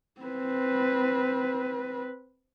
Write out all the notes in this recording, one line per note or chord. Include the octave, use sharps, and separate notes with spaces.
C4 B4